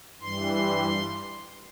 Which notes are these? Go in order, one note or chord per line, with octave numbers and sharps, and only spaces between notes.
G2 E3 G3 C6